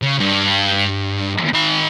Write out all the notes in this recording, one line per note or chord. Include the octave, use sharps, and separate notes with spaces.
C#3
G2
D#3 B5